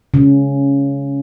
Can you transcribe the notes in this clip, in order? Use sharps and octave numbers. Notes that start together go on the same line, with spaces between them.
C#3